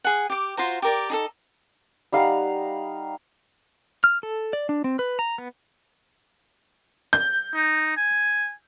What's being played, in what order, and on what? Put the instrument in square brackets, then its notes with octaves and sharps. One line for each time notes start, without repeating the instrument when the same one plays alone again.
[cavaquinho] G#4 F#5
G4 D6
F4 F#4 C5 A#5
G4 A#4 D5
D#4 G#4 A4
[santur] G3 D#4 F5 F#5
[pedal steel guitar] F6
A4
D5
D4
C4
B4
A#5
B3
[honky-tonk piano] G6
[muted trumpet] D#4
G#5